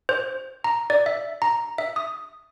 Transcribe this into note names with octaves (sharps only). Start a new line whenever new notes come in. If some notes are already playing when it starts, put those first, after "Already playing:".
C5
A#5
D5
E5
A#5
E5
D#6